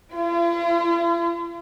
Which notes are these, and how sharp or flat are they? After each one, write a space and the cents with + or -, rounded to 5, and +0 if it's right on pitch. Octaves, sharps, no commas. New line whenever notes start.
F4 -45